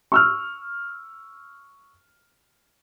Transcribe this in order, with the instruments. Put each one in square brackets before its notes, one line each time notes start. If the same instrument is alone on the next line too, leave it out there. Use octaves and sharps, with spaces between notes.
[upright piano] C#6 E6 F6